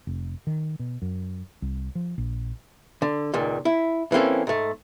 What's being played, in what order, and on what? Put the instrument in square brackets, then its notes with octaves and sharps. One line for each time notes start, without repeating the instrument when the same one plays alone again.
[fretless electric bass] F1
D#3
B2
F#2
C2
F3
A#1
[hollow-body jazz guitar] D3
C#2 A#2 D#3
E4
E3 A#3 C4 C#4 A4
G#2 A3